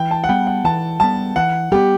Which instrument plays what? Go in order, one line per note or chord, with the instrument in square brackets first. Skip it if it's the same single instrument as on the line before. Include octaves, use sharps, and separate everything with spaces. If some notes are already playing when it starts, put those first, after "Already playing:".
Already playing: [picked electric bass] E3 [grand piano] G5
[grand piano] A5
F#5
[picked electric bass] G3 B3 [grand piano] G5
[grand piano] F#5
[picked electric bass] E3 [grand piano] A5
[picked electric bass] G3 B3 [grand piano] A5
[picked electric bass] E3 [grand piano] F#5
[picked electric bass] G3 B3 [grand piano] G4